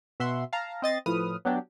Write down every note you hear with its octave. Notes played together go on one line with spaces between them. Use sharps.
B2 E5 F#5 C6
F5 A5 A#5
C4 D#5 A6 C7
A2 F3 B4 D#6 F6
F#3 B3 D4 G4